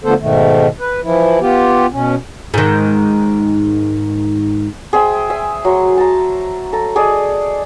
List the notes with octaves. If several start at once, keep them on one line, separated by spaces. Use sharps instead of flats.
D3 F3 A3 B3 A4 C5
G#2 B2 D#3 A3
B4
E3 F3 E4
B3 F4 G4
B2 C#4
G#2 D#3
G#4 C5 E5 G5
E5 G#5
F#3 C6
A5 A#5
A4 A#5
G#4 A4 D5 D#5